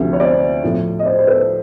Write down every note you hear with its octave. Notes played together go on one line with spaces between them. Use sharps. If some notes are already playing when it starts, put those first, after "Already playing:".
Already playing: D2 C3 F3 A3
C#5
C5 D5
A2 F3 A3
D#5
C5 D5
C5
A4 B4